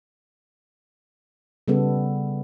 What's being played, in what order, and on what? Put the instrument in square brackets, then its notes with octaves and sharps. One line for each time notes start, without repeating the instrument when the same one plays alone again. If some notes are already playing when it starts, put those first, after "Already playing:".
[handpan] C#3 G3 B3 A4